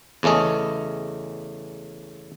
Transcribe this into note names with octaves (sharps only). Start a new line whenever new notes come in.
E2 C#3 A3 C#4 D#5